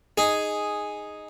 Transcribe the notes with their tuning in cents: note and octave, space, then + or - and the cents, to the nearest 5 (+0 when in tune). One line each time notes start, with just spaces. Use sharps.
D#4 +0 G#4 +0